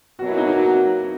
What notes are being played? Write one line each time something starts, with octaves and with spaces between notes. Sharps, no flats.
B2 F#3 A#3 F#4
E4
D#4
D#4
F#4